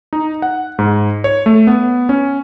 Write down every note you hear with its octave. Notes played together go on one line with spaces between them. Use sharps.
D#4
F#5
G#2
C#5
A3
B3
C#4